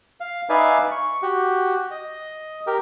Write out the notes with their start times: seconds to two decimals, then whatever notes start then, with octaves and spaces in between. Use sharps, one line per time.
0.20 F5
0.49 D#4 B4 D5 E5 F5 G#5
0.91 C#6
1.22 F#4 G4
1.91 D#5
2.67 G4 A#4